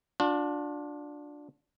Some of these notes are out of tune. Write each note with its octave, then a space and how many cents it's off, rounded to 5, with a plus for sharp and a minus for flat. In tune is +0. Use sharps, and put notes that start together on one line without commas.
D4 +0 F4 +40